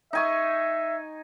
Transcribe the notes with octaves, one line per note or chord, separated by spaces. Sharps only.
D#4 E5 G#5 C#6